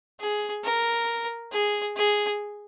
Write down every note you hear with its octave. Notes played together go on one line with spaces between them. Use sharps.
G#4
A#4
G#4
G#4